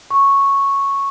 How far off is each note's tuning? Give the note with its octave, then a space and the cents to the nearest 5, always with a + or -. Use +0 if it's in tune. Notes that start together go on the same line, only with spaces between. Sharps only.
C#6 -5